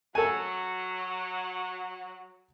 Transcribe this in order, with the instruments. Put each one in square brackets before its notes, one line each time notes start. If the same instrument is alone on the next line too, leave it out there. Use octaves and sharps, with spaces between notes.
[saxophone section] F#3 [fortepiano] A4 G#5